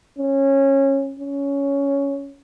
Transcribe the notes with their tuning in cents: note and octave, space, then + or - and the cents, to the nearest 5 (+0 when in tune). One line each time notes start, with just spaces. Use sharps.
C#4 -20
C#4 +10